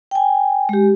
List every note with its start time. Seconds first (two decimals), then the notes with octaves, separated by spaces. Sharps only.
0.11 G5 G#5
0.69 G#3 G4